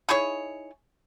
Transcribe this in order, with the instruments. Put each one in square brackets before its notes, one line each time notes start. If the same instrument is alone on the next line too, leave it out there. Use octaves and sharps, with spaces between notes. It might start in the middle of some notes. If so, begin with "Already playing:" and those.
[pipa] D#4 E4 G#4 C#5